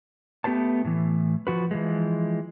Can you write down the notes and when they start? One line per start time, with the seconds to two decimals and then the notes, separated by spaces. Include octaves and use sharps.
0.44 A3 B3 G4 B4 C5 A5
0.85 A2 E3
1.47 F3 F#4 B4
1.71 E3 F3 G#3